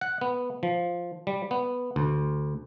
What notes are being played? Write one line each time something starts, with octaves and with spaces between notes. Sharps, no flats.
F#5
B3
F3
G3
B3
D2